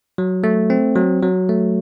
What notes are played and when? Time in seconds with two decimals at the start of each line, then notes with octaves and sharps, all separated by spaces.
0.18 F#3
0.44 A3
0.70 C4
0.96 F#3
1.23 F#3
1.49 A3